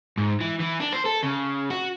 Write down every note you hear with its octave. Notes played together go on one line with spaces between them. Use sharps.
G#2
E3
E3
D4
C5
A4
C#3
F#4